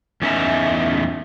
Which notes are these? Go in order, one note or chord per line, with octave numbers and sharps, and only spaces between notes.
E2 A3 C#4 D#4 E5 A#5